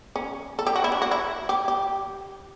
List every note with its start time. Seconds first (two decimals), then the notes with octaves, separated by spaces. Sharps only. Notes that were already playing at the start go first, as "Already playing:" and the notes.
0.16 C#4
0.59 A4
0.67 G4
0.76 F#4
0.84 E4
0.92 D4
1.02 F#4
1.11 E4
1.49 G4
1.68 G4